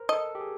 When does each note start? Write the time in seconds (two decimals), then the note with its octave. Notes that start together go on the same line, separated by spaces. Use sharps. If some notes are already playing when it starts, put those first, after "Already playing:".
Already playing: A#4 C5
0.09 A4 D#5
0.35 G4
0.41 G#4